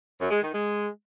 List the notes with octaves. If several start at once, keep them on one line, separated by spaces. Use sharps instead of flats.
F#2
G#3
D#3
G#3